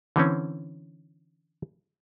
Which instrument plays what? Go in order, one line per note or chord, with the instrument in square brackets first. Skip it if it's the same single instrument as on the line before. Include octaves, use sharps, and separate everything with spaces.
[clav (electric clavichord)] D3 E3 C4 C#4